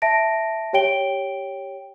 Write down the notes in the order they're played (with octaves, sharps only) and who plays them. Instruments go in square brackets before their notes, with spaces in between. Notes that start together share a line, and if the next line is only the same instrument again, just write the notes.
[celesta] E5 A5 A#6 D7
G4 C#5 G5 D7 G7